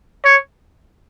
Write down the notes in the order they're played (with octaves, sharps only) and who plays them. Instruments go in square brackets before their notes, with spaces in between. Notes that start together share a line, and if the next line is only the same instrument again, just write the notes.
[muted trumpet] C#5